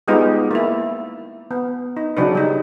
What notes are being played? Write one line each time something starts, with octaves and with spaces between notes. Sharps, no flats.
G3 G#3 B3 D#4 F4 G4
A#3 E4
B3
D#4
C#3 F#3 D4 B4
G3 D#4